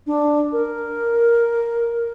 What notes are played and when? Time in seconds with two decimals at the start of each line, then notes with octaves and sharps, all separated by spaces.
0.07 D4
0.53 A#4